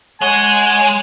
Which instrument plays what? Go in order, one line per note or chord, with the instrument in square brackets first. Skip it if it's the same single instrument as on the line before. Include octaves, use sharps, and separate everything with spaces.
[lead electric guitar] G#3 [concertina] C#5 F#5 [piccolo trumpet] G#5